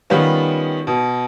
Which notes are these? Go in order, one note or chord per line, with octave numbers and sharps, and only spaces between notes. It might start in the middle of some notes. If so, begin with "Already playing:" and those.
D#3 G3 B3 C#4 F4
B2